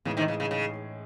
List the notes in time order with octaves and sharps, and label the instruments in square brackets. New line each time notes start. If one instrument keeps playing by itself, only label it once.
[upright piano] A2 E3 G#3 D#4 G#4 [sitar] C#3
[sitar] C3 D#3
C#3
C#3
C#3